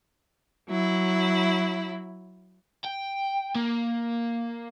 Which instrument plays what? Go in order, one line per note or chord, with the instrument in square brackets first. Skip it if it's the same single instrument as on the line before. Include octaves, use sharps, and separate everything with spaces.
[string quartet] F#3 E4
[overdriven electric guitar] G5
A#3